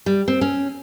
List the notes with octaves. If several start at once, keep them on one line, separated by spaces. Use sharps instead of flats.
G3
C4
C#4